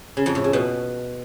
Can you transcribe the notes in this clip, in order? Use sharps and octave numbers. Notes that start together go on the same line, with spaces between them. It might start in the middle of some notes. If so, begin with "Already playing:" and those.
C#3
F2
A2
C#3
B2